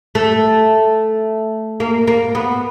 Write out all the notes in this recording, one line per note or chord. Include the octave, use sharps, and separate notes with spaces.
A3
A#3
A#3
B3